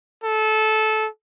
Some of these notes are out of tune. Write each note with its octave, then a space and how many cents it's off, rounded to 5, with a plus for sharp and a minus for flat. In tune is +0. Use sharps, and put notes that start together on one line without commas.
A4 -20